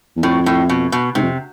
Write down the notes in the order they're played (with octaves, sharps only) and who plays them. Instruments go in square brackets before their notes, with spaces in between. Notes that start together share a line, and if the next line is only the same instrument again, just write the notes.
[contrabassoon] E2
[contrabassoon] F2 [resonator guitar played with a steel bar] A2
[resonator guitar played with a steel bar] A2
B2
B2
[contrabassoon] G#2 [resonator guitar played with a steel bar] C3
[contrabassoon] F2